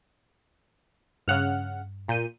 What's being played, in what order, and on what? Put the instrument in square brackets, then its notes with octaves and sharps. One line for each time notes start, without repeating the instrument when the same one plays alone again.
[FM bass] G2 [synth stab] C#3 F#5 F6
[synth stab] A#2 G6 D#7